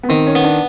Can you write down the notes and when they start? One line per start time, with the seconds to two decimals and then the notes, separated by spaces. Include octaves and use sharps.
0.03 B3
0.09 D#3 C4
0.27 C#4
0.35 B3
0.44 D4